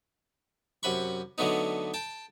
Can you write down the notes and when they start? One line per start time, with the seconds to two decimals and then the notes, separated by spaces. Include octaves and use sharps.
0.83 F#2 C3 F#5 B5 C#6
1.38 D3 F#3 A3 B3 D#4
1.94 G5 A5